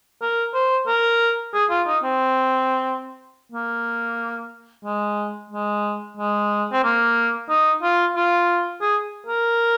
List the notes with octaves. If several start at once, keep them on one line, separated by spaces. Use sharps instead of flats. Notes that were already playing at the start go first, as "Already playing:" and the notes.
A#4
C5
A#4
G#4
F4
D#4
C4
A#3
G#3
G#3
G#3
C4
A#3
D#4
F4
F4
G#4
A#4